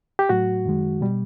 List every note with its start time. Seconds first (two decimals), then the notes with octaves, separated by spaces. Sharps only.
0.19 G4
0.29 A2 F#3 F#4
0.65 F#2 D#3 G#3
1.01 B2 G3